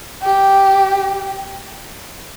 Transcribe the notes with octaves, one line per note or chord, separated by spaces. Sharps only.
G4